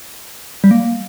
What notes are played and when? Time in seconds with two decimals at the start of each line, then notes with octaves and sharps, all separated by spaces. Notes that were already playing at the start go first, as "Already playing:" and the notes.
0.64 G3
0.71 A#3